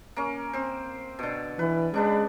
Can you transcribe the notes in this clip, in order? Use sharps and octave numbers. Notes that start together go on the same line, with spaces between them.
A#3 C#4
C4 C5
B2 D3
E3 B4
C#3 G#3 D4 B4